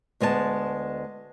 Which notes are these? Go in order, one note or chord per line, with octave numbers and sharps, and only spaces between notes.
D2 G#3 B3 D5 A5